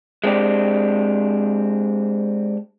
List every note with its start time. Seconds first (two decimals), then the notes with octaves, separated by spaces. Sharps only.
0.24 G#3 C4 D4 G4